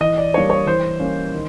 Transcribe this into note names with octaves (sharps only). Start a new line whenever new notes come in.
E3 D#5
D5
G3 A#3 D4 C#5
C#5
E3 C5
G3 A#3 C#4
D#3